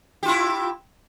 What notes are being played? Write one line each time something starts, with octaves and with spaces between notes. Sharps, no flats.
E4 F4 G4